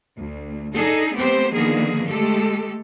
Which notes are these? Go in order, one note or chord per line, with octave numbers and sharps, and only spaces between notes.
D2
D4 D#4 G#4 A4
A3 B3 C4 G4 C5
D3 D#3 F3 A#3 B3 G#4
G#3 A3 G4 A4